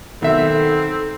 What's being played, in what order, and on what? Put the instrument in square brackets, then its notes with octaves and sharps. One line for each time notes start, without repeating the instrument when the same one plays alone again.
[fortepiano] B1 E5 [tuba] D#3 [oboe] C4 [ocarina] A4